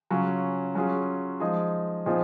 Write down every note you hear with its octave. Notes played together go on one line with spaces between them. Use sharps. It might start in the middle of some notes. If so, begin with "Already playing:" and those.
C#3 F#3 C#4 F4
F#3 C#4 F4 G#4
F3 G#3 D#4 G#4
A#2 F3 C4 D#4 G#4